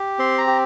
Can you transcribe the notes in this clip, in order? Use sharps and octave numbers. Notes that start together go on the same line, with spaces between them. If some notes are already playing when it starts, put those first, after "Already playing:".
Already playing: G4
C4 C6
A#5
G4